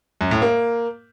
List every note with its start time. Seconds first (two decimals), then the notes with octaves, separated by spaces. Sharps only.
0.21 F#2
0.31 A2
0.42 A#3